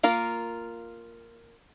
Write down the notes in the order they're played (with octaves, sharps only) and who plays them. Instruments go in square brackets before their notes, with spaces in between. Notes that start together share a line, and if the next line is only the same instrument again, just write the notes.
[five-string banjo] A#3 F4 A#4